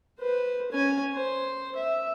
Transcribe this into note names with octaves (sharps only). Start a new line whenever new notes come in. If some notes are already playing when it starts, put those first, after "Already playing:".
B4 C5
C#4 G#5
C5
E5